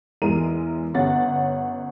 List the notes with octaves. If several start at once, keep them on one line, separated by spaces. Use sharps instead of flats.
E2 G#3 A#4 D#7
G1 C#4 F#5 A6